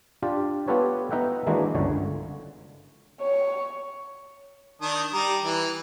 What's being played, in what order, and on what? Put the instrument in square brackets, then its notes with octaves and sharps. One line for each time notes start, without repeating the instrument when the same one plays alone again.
[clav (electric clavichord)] D4 F4 G4 D5
B3 F4 G4 A4 B4 C#5
B3 D#4 D#5 E5 F#5 G5
D#3 E3 G#3 A#3 D4 F#4
G1 C#2 D3 C#5
[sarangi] C#5
[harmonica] D#3 D4 D#6
G3 A#5
E3